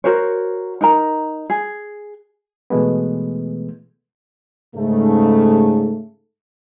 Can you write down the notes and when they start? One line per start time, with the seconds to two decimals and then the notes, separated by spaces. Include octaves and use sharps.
0.04 F#4 A#4 C5 C#5
0.81 D#4 A#4 A#5
1.50 G#4
2.70 B2 E3 G#3 A3 B3
4.75 G#2 C#3 A3